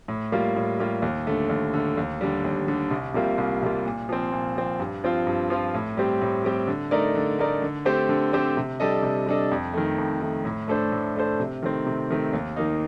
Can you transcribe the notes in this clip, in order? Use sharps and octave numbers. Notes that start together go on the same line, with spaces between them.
A2
G3 A#3 F4
A2
G3 A#3 F4
D#2
D3 A3
D#2
D3 A3
D#2
D3 G3
D#2
D3 G3
C2
C3 G3 A#3 F4
C2
C3 G3 A#3 F4
A#2
F3 C4
A#2
F3 C4
G2
F3 C4 F4
G2
F3 C4 F4
A2
G3 C4 G4
A2
G3 C4 G4
D3
A3 D#4 A#4 D5
D3
A3 D#4 A#4 D5
D3
A3 C4 G4 C5
D3
A3 C4 G4 C5
C3
G3 D4 A4 D#5
C3
G3 D4 A4 D#5
F2
D#3 A3
F2
D#3 A3
A2
A3 D4 A4 C5
A2
A3 D4 A4 C5
C3
D#3 A3 C4
C3
D#3 A3 C4
D#2
D#3 A#3 D#4